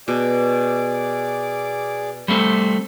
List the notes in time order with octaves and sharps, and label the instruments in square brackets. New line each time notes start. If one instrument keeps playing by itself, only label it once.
[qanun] B2 [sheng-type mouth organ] G#4 D5 D6
[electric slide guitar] G3 A3 C4 [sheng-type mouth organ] C6